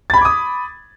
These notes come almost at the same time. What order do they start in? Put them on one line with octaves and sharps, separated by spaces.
A6 B5 G#6 D6 D#6